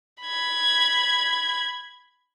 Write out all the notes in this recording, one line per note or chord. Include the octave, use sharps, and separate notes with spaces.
B5 G#6